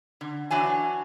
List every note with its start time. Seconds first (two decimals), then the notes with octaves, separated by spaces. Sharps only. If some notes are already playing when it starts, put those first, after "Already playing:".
0.21 D3
0.50 E3 F#3 D4 G#5